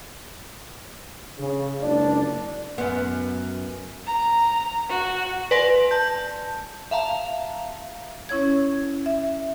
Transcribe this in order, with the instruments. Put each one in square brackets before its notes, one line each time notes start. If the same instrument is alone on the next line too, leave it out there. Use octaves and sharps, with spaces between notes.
[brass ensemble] C#3
F#1 C#2 D4 D5
[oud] F#2 B3
[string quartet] A#5
F#4
[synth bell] B4 D5 G#5 C6 A#6 F#7
A5 G6
E5 F5 A5 A#5
[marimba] C#4 E4 C#5 G#6
E5